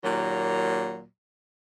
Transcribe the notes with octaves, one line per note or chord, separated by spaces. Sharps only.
D#2 A#2 F#3